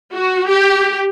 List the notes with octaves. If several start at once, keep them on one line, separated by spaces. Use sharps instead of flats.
F#4
G4